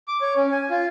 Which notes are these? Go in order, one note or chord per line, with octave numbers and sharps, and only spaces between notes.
D6
C#5
C#4
G#5
F4